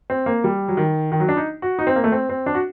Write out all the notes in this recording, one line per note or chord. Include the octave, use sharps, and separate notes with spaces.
C4
A#3
G3
F#3
D#3
D#3
F#3
D4
D#4
F#4
D#4
C4
A#3
A3
C4
C4
D4
F#4